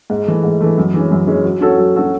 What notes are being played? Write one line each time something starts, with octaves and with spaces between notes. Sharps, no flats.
G#2
E3 A3
G#2
E3 A3
F#2
E3 G#3 C#4
F#2
E3 G#3 C#4
F#3
C#4 F#4 A4 C#5
F#3
C#4 F#4 A4 C#5